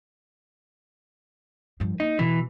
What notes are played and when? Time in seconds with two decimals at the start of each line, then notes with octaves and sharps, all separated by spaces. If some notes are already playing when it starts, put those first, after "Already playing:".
1.80 G2 F3
2.00 A#3 D#4
2.19 B2 E3